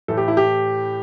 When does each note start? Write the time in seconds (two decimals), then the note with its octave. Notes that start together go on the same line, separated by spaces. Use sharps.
0.08 A2 E3 A3 A4
0.17 G4
0.28 E4
0.37 G4